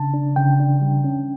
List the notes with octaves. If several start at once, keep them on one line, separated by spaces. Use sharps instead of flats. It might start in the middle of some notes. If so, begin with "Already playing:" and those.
Already playing: C#3 D4 A5
D4
C#3 G5
D4
G3
C#4